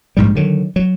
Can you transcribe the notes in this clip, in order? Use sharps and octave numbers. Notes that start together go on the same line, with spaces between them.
A#1 G#2 G3
D3 D#3 F#3
F#3